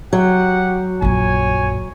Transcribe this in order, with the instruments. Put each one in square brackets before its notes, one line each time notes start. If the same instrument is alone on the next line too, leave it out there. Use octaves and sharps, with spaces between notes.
[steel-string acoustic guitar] F#3 [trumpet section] G4 F#5
[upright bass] A#1 F#2 [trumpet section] C#5 G#5